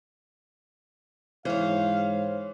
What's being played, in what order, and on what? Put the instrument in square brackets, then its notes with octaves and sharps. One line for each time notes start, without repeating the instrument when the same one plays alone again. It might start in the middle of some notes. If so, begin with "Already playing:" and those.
[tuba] G#2 [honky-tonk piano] E3 [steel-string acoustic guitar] C5 C#5 [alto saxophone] F5